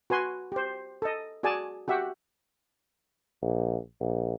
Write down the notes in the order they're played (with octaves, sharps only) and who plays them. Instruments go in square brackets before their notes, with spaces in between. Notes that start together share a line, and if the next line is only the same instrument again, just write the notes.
[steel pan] F#4 B4 G#5 C6
G4 C5
A4 D#5
F#4 G#4 D5 G#5 A5
F#4 G4 E5 F#5
[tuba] A#1
A#1